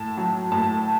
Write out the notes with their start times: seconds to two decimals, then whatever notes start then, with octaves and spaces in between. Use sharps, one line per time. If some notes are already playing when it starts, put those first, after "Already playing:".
Already playing: A2 A5
0.17 F#3
0.51 A2 A5